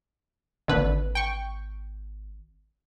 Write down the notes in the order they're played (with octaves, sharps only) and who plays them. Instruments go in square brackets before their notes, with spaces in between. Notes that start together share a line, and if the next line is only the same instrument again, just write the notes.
[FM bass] G#1 [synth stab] D#2 D3 B4
[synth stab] G5 C#6